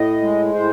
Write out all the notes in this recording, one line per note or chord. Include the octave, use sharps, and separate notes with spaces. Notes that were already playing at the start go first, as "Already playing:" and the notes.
Already playing: A2 D#5
G#3
A2 C5